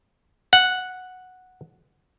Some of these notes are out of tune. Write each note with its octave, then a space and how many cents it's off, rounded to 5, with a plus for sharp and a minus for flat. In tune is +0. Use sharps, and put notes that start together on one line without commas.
F#5 -5